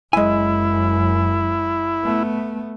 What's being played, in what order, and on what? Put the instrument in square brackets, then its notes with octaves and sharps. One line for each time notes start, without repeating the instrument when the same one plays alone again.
[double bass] F#1 F#2 [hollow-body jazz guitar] G#3 G#5 [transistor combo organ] E4
[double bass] A3 B3